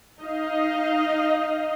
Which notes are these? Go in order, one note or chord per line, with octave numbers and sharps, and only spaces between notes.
D#4 D#5 F5